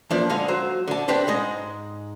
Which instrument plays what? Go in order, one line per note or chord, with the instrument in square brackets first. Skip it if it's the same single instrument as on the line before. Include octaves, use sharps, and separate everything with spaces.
[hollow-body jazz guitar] F3 A#3 D4 B4
D3 G#3 F5
F#3 C5
D3 A5
C4 D4 G4 B4 C5
G#2 G#3 D#5